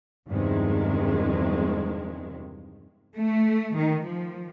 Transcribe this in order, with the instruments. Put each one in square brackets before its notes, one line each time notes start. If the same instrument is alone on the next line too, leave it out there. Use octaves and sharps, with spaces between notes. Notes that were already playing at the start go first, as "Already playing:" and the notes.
[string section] E2 G2 C3 D#3 F3 G#3
[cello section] A3
D#3
F3